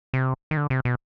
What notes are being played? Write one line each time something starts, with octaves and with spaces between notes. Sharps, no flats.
C3
D#3
D3
C3
B2